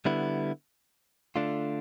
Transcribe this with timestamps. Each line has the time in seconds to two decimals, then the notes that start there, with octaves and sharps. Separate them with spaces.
0.05 D3 G3 B3 E4
1.36 D3 A3 D4 F4